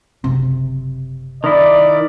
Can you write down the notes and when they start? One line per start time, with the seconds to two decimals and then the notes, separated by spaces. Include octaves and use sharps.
0.24 F#1 C3 C4
1.44 D#3 E4 D5